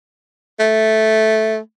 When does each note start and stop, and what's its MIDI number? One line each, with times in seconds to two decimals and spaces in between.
0.60 1.58 57